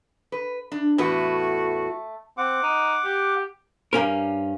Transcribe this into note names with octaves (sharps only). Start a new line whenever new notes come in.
B4
D4
E2 A2 A3 F#4 B4
C4 F#5 D6
D#4
G4
G2 C#4 A#4